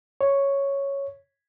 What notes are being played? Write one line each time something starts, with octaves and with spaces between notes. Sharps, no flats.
C#5